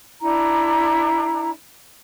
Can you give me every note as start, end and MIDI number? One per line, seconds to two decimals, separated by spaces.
0.20 1.50 62
0.20 1.50 64
0.20 1.50 82